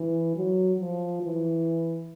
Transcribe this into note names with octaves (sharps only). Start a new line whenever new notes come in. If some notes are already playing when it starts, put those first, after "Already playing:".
Already playing: E3
F#3
F3
E3